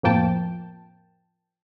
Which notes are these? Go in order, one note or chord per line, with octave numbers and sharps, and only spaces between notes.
F2 A2 F3 A#3 G5 A5